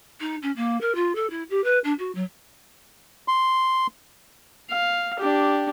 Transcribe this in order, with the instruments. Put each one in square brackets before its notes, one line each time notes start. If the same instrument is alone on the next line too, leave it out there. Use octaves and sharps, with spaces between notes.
[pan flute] D#4
C#4
A#3
A#4
F4
A4
E4
G4
B4
D4
F#4
F#3
[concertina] C6
[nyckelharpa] F5
D4 G4